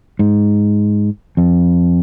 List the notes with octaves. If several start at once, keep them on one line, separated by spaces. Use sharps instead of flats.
G#2
F2